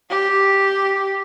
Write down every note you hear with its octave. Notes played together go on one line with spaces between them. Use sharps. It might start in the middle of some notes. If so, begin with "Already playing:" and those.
G4